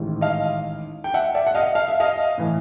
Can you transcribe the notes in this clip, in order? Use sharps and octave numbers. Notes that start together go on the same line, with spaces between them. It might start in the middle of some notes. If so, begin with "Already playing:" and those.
Already playing: A1 G#2 D#3
D#5 F5
G5
E5 F#5
D5 E5
F#5
D#5 F5
F5
E5
D#5 F5
A2 E3